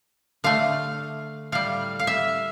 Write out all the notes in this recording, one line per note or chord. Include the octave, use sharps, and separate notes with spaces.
D3 A3 F5
A2 G3 F5
F5
E5